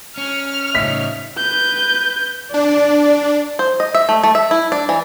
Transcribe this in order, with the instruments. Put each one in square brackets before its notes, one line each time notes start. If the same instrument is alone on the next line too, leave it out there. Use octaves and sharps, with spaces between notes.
[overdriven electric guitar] C#4 [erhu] F6
[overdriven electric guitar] A2 C#3 [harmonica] D#4 C#5 E5 [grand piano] B6
[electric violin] B4 G6
[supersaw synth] D4 [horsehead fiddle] D5
[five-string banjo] C5
D#5
E5
A3
A3
E5
E4
D4
E3